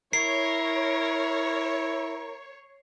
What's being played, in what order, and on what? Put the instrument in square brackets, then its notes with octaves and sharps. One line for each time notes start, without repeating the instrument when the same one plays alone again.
[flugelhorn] E4 [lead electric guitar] A#4 [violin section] C#5 [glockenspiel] C7